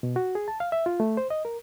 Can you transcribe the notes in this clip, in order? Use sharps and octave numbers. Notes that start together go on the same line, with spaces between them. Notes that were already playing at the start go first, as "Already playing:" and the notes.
B2
F#4
G#4
A5
F5
E5
F4
A3
C5
D#5
A#4